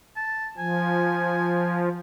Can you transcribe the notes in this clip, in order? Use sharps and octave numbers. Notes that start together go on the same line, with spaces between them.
A5
F3 G#5